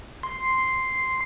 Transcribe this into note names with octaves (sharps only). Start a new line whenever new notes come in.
C6